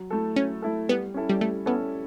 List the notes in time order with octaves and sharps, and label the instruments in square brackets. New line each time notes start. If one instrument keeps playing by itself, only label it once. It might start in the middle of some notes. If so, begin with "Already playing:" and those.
Already playing: [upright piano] F#3
A3 E4 A4
[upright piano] F#3 [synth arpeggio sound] C#4
[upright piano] A3 E4 A4
[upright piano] G3 [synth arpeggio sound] B3
[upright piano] C#4 E4 A4
[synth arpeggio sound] G3
[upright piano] G3 [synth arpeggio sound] A3
[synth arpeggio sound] B3 [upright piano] C#4 E4 A4